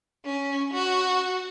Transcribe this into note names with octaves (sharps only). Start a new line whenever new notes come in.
C#4
F#4